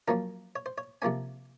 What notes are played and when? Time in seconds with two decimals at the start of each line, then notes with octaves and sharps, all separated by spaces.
0.08 F#2 F3 A#3 C#4 A#4
0.56 C#5
0.66 C5
0.78 C#5
1.02 C3 F3 A#3 C#4 G#5